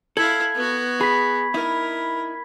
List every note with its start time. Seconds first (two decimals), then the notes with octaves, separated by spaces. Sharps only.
0.17 E4 A4 F5 G#6 F#7
0.55 B3 F#4
1.01 G#4 B5 B6
1.54 D#4 E4 A#4